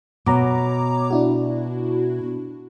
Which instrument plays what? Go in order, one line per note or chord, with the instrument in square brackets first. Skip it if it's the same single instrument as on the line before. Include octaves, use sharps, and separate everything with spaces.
[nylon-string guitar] B2 [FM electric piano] C#5 A#5 D6
[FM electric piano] D4 E4 F#4